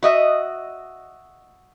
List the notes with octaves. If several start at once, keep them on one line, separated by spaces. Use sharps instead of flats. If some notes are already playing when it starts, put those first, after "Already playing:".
F#4 D#5 E5